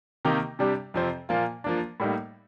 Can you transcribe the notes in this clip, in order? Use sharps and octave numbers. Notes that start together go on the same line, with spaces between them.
C3 D#3 A#3 D#4 G4
C3 G3 D4 G4
F2 C3 F3 C4
A#2 F3 A#3 F4
F3 A#3 D4
A2 G3 A#3 D#4